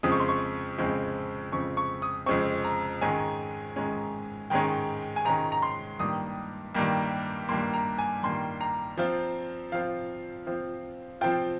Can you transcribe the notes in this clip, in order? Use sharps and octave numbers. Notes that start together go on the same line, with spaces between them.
F2 C#3 G#3 C4 D#6
C#6
C6
C#6
F2 C#3 G#3 C4
F2 C#3 G#3 C4 C#6
C#6
D#6
F2 C#3 G#3 C4 C#6
A#5
G#2 D#3 G#3 C#4 G#5
G#2 D#3 G#3 C#4
G#2 D#3 G#3 C#4 G5
G#5
G#2 D#3 G#3 C#4 A#5
A#5
C6
G2 D#3 G3 A#3 D#6
G2 D#3 G3 A#3
G2 D#3 G3 A#3 C6
A#5
G#5
G2 D#3 G3 A#3 C6
A#5
F3 C4 F4
F3 C4 F4 F5
F3 C4 F4
F3 C4 F4 G5